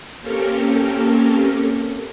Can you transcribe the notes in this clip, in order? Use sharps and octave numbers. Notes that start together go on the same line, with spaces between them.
A#3 C4 C#4 G4 A4 A#4